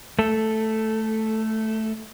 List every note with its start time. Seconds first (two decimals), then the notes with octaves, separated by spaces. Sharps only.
0.19 A3 A4